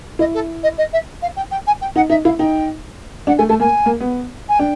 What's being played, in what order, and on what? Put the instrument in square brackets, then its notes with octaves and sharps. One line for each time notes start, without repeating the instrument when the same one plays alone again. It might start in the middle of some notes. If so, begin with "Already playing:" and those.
[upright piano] E4 [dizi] D#5
[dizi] A4
D#5
D#5
E5
F5
G5
G5
G#5
G5
[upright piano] D#4 [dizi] F#5
[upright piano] D#4 [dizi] E5
[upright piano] E4 [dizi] F5
[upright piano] D#4 [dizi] G5
[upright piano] D4 [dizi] F#5
[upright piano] A3 [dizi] G#5
[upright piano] A3 [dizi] A5
[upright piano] A#3 [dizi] G#5
[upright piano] A#3
B3
[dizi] G#5
[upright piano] D4 [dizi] G5